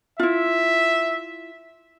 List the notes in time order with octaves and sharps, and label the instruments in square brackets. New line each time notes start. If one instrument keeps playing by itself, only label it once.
[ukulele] E4 F4 [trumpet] E5